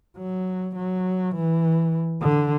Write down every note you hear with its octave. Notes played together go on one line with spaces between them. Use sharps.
F#3
F#3
E3
D3